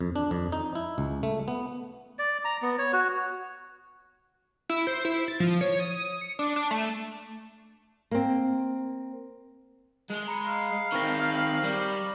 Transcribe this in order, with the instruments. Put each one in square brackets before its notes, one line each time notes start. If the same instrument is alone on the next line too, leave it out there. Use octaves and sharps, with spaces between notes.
[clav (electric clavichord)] F2
D4
F2
D#4
E4
C#2
A3
B3
[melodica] D5
A#5
B3
C#5
F#4
[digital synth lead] E4
C5
E4
A6
F3
C#5
D#6
C#7
D4
D4
A3
[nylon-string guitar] A#3 C4
[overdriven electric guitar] G#3
[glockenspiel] A#5 B5 C#7
[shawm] F5
[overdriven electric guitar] D#3 C4 [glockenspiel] C#6 F6 A#6
[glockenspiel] F#7
[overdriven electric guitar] G3